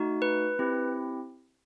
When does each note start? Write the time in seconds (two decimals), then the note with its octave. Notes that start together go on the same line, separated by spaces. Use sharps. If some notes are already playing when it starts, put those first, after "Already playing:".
Already playing: A3 D#4 F#4
0.22 B4
0.59 C4 E4 G4